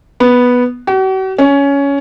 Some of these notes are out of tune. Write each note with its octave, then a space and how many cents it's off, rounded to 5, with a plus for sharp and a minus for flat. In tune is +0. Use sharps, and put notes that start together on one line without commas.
B3 -5
F#4 +45
C#4 +15